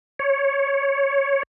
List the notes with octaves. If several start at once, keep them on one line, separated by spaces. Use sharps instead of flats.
C#5